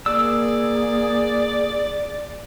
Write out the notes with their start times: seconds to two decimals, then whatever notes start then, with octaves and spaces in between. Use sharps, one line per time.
0.06 A#3 G#4 D5 E6